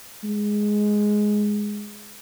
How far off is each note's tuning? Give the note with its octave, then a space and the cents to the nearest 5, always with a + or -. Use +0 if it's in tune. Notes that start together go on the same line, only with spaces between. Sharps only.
G#3 +5